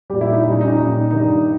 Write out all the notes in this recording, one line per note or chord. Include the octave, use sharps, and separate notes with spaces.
A#2 G3 G4
E4
D#4
A#2 G3 D#4
C#4
D#4
C#4
A#2 G3 D#4
G2 D#3 G3 D#4